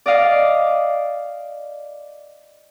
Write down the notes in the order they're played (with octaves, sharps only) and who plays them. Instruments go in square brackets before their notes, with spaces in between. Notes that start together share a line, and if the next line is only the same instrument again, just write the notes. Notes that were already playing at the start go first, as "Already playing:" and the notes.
[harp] D5 D#5 F5